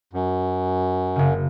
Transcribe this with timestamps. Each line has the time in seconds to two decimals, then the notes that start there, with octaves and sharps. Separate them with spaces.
0.13 F#2
1.16 F#1 C#3